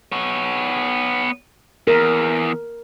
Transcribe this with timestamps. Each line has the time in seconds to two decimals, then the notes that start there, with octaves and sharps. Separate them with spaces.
0.12 B3 C#5
1.87 E2 A#4